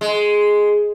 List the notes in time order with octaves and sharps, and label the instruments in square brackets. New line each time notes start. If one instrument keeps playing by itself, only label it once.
[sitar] G#3